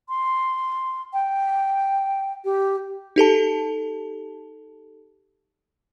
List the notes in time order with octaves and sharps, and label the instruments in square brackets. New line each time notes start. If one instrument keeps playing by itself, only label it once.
[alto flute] C6
G5
G4
[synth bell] D#4 G4 A4 A5